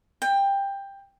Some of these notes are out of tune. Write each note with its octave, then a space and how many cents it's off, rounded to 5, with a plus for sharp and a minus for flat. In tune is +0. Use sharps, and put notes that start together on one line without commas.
G5 +15